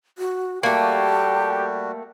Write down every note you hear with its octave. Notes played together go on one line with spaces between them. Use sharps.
F#4
G3 A3 A#3 F#4 G4 A5